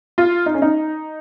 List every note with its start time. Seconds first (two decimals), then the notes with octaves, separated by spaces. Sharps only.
0.18 F4
0.46 D#4
0.54 C#4
0.62 D#4